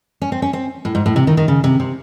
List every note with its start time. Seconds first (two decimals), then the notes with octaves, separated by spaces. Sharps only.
0.22 C#4
0.32 C4
0.42 C#4
0.53 C4
0.85 A2
0.95 G#2
1.06 A2
1.16 C3
1.27 D#3
1.37 D#3
1.48 C#3
1.64 C3
1.80 C3